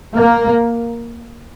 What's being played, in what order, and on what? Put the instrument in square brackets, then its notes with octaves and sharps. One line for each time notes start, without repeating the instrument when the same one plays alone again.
[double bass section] A#3